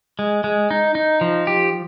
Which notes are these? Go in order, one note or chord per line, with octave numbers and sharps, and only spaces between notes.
G#3
G#3
D#4
D#4
F3
G4